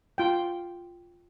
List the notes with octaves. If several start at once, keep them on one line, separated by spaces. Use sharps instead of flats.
F4 G5